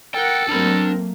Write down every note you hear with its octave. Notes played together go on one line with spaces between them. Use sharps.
A4 A#4 F#5 G5
F#3 A3 A#3 C4 D4 A#4 B5